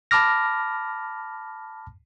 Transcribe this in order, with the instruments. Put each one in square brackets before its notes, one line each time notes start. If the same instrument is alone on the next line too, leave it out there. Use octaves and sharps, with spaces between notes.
[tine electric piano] A5 B5 D6 F6 A#6